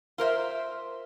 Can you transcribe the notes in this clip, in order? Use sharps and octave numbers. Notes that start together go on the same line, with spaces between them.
F4 A#4 C5 E5